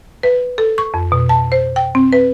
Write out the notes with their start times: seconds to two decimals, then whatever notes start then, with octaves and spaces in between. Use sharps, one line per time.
0.23 B4
0.58 A4
0.78 C#6
0.94 F2
1.12 B2
1.29 A5
1.52 C5
1.76 G5
1.95 C4
2.13 B4